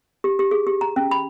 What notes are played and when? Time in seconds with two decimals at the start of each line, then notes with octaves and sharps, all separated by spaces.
0.24 G4
0.39 G4
0.51 G#4
0.67 G4
0.81 A#5
0.96 C#4
1.11 B5